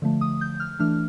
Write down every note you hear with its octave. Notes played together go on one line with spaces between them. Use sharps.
D3 F3 A3
D#6
G6
F6
E3 A3 D4 F6